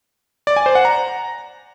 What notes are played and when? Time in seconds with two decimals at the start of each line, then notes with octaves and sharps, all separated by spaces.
0.47 D5
0.56 G#5
0.66 C5
0.75 F#5
0.85 A#5